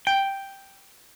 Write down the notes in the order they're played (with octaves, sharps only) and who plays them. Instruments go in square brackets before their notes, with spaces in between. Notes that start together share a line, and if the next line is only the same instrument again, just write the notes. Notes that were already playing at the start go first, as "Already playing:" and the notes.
[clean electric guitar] G5